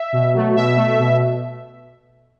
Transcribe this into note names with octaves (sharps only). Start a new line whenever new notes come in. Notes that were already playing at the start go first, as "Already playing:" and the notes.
Already playing: E5
B2
F#3 A3
B2 E5
A3
B2